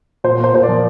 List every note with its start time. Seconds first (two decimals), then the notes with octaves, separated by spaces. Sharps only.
0.24 A#2 C5
0.39 A#3 C5
0.54 A#2 C5
0.63 D5
0.69 F3